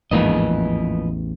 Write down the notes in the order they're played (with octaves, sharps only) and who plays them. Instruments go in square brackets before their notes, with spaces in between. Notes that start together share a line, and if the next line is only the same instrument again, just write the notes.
[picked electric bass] A1 E2 [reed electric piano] G#2 A#3 [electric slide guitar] F3 B4 D#5